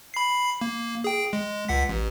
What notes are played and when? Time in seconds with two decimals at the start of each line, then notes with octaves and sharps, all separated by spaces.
0.14 B5 C7
0.61 A#3
1.04 G#4 G5
1.33 G#3
1.69 C#2 F#5 B6
1.89 A1